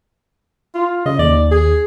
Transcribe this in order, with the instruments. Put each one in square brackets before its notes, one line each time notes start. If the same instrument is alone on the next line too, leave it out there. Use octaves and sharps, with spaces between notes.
[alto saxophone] F4
[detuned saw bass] C#3 [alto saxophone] D#5
[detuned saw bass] D#2 [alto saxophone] D5
[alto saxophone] G#4